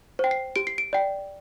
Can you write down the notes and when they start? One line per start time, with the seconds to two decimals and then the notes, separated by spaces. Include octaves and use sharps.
0.19 C5 G5
0.31 C7
0.56 G4 D7
0.67 C7
0.78 D7
0.93 D5 G5